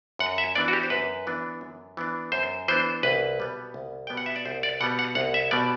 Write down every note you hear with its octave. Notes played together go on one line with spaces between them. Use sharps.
F#2 F#5
E5
E3 B3 D4 D5
F#4
G4
C5
F#2 B4
E3 B3 D4
F#2
E3 B3 D4
F#2 C5
E3 B3 D4 C5
C2 B4
B2 G3 B3
C2
B2 G3 B3 G5
F#5
E5
D5
C2 C5
D5
B2 G3 B3 F#5
F#5
C2 F#5
E5
B2 G3 B3 D5